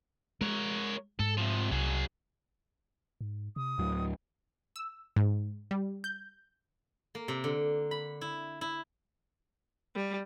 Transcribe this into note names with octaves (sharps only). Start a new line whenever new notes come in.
G#3 A#4 C#5
G#2 A4
C3 F3
C2 F#3 G#4
G#2
C3 D#6
D2 A2 F#3
E6
G#2
G3
G6
A#3
C3
D3
B5
E4
E4
G3